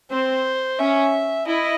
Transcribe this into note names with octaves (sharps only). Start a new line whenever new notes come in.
C4 C5
C#4 E5
E4 D#5